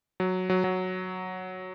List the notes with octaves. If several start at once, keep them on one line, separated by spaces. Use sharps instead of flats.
F#3
F#3
F#3